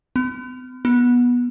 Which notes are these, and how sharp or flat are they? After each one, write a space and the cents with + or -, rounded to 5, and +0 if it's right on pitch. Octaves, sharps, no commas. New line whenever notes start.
B3 +45
B3 -15